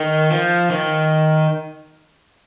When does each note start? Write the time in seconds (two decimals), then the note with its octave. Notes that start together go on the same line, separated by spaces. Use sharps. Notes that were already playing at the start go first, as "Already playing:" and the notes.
Already playing: D#3
0.31 F3
0.71 D#3